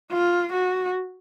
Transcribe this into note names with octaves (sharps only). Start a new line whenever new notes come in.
F4
F#4